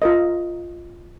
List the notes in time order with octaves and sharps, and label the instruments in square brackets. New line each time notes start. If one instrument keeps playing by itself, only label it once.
[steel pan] F4 A#4 D#5